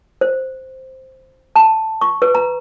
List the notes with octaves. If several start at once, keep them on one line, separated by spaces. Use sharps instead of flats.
C5
A5
C#6
B4
A#5